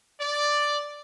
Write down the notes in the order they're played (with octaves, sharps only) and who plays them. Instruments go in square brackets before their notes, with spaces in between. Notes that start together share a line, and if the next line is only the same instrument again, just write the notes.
[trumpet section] D5